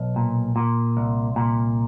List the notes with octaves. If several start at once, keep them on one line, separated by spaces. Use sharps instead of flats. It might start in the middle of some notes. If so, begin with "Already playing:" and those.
Already playing: B1
A#2
A#2
C2
A#2